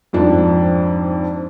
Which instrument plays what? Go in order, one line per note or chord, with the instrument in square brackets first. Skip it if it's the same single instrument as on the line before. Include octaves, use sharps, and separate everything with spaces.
[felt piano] F2 G#2 F3 D4